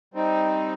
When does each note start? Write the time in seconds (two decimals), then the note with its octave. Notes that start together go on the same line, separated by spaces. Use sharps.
0.14 G3 C4 D#4